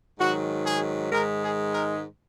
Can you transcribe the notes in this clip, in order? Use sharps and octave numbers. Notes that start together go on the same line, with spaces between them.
G#2 D#3 F#3 F#4
G#4
G#2 D#3 G#3 A#4
G#4
A#4